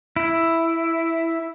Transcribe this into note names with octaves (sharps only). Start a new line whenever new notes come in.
E4